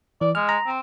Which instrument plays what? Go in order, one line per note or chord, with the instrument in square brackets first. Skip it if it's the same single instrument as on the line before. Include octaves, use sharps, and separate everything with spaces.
[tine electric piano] E3 [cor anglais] D5
[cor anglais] G#3 [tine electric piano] F6
[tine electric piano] A#5
[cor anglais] C4